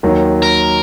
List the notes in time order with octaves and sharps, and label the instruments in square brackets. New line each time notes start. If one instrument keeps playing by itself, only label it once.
[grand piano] D#2 D#3 F#3
[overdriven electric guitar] A#4